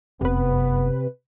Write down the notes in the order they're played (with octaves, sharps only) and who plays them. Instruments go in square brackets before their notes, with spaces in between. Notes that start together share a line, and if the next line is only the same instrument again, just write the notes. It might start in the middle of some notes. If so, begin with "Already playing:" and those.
[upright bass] F1 F#2 [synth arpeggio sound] C3 B4 [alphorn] B3